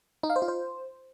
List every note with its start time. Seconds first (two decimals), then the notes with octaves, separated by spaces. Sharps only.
0.23 D#4
0.30 F5
0.36 C5
0.42 F4
0.48 C5